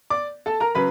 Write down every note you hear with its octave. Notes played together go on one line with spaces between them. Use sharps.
D5 D6
A4 A5
A#4 A#5
C#3 F#3 B4 B5